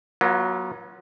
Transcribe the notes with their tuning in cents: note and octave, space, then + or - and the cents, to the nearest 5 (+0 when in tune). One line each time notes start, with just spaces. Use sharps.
F#3 +0 B3 -45 F4 +0